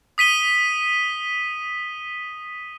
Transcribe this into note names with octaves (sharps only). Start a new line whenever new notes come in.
D#6 B6 D#7 G7